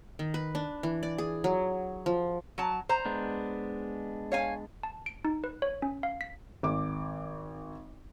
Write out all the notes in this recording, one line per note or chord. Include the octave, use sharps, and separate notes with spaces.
D#3
B4
D4
E3
D5
G#4
F#3
F3
F#3 A5
C5 A#5
G#3 B3 D4
C#5 F5 G#5
A5
D7
D#4
B4
C#5
C#4
F5
B6
G#1 D6